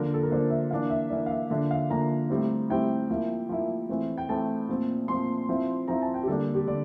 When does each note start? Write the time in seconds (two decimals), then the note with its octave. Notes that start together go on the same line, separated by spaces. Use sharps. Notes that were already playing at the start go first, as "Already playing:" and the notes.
Already playing: D3 F3 A#3 D4 A#4
0.14 A4
0.23 A#4
0.31 D3 F3 A#3 D4 C5
0.50 E5
0.71 E3 A#3 D4 F5
0.90 E5
1.10 E3 A#3 D4 D5
1.26 F5
1.31 E5
1.50 D3 F3 A#3 D4 E5
1.71 F5
1.90 D3 F3 A#3 D4 A#5
2.30 A2 G3 C4 E4
2.69 A2 G3 C4 E4 G5
3.10 F3 A#3 E4
3.49 F3 A#3 E4
3.89 A2 E3 A3 C4
4.18 G5
4.29 A2 E3 A3 C4 A5
4.69 A#2 F3 C4
5.08 A#2 F3 C4 C6
5.49 F3 C4 E4
5.88 F3 C4 E4 A#5
6.02 A5
6.14 G5
6.23 G4
6.27 D3 G3 A#3 D4 A4
6.55 G4
6.67 D3 D5